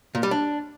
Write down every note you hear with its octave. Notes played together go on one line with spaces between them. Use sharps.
A#2
G3
D4